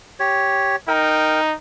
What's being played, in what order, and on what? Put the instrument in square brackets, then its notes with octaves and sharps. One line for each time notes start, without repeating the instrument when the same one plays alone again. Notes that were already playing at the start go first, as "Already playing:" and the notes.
[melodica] G4 C#5
[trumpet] D#4 [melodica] A#4 G5